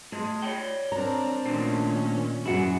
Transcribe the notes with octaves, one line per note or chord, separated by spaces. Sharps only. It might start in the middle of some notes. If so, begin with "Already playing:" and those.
A3 G#4 D#5
C#5 D5 G5
C4 D4 A#4 A#5
A#2 D#3 A3 C#4 D4 C5
F#2 E4 F#4 G#4 F#5